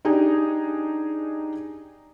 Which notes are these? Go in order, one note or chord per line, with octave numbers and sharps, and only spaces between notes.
D4 D#4 G4 G#4